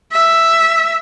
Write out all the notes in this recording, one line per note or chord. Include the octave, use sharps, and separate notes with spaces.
E5